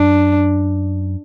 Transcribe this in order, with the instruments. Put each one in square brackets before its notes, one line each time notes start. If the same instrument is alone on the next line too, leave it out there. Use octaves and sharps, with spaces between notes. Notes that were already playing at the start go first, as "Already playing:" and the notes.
Already playing: [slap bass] F#2 [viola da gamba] D4